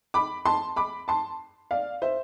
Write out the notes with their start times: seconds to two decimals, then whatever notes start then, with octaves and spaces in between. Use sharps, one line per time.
0.14 B5 D6
0.45 A5 C6
0.76 B5 D6
1.08 A5 C6
1.71 D5 F5
2.02 C5 E5